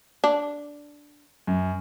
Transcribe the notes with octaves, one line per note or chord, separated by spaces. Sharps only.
D4
F#2